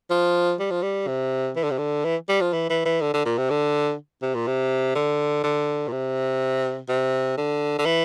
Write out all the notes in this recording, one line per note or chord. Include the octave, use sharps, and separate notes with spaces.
F3
G3
F3
G3
C3
E3
D3
C3
D3
E3
G3
F3
E3
E3
E3
D3
D3
A#2
C3
D3
C3
A#2
C3
D3
D3
A#2
C3
C3
D3
D3
E3